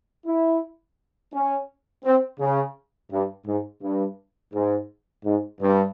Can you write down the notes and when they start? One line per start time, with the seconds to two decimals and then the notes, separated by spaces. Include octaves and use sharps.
0.26 E4
1.34 C#4
2.05 C4
2.39 C#3
3.11 G2
3.46 G#2
3.82 G2
4.54 G#2
5.25 G#2
5.61 G2